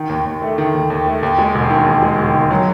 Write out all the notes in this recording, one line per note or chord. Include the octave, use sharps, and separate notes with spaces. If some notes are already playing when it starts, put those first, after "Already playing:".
Already playing: D#3
D#2
D#2
A3
D#3
D#2
D#2
A3
D#2
G#3
E1
D#3
D#2
G#3
E1
D#3
F#3